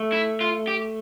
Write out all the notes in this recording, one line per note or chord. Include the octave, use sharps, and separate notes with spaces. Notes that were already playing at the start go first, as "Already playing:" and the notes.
Already playing: A3
E4
F4
G4